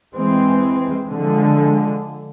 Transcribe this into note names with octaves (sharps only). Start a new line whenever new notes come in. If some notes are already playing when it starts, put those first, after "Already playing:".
E3 G#3 C4
D3 F3 G#3